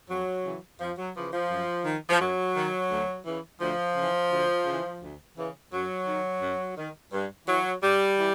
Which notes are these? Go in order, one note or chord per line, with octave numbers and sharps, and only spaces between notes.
F2 F#3
C#3 E3
F2 F3
F#3
C#3 E3 F3
F3
F#2
D#3
F3
F#2 F#3
D#3
D2
C#3 E3
D2 F3
C#3 E3
D2
C#3 E3
D2
C#3 E3
F#2 F#3
D#3
F#2
D#3
G2
E3 F#3
G2 G3
E3